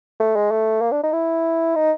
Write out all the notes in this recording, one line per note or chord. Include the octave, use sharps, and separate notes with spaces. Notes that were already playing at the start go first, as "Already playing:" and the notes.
A3
G#3
A3
A#3
D4
D#4
E4
D#4